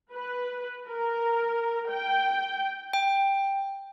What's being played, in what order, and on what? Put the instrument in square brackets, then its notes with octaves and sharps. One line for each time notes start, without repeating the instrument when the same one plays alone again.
[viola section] B4
A#4
G5
[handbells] G5